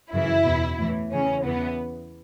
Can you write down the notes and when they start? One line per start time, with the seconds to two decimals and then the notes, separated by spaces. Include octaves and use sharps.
0.12 F#2 C#3 E3 E4
0.45 E2 B2
0.79 A2 E3
1.11 E2 C#3 E3 C#4
1.45 E2 C#3 E3 B3